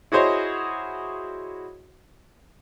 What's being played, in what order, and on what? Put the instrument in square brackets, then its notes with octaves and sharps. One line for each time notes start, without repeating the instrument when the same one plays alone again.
[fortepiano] E4 F#4 G#4 C5 C#5 D#5